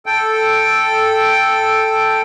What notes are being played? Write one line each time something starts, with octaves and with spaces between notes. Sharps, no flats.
A4 G5